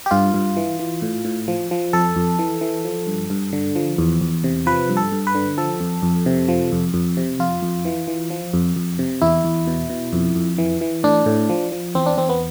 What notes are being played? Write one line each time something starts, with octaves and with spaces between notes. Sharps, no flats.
G4
G2 F4
G2
E3
E3
A2
A2
F3
F3
F2 A4
F2
E3
E3
F3
G2
G2
D3
F3
E2
E2
C3
F3 B4
G2
A4
G2
B4
D3
F3 A4
F2
F2
C3
F3
F2
F2
C3
F2 F4
F2
E3
E3
F3
F2
F2
C3
E2 E4
E2
B2
B2
F2
F2
E3
E3
A2 D4
A2
F3
F3
E2 C4
D4
E2 C4
B3